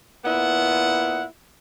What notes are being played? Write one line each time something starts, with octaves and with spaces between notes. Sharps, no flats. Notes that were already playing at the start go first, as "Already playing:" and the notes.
A#2 B3 E4 F#5